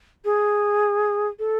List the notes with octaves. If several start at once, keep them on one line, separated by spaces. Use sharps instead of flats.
G#4
A4